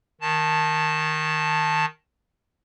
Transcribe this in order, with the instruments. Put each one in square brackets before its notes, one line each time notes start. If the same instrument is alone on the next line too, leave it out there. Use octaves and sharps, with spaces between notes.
[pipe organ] D#3 A5